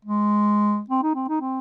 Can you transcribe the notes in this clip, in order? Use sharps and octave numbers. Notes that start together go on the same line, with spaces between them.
G#3
C4
D#4
C4
D#4
C4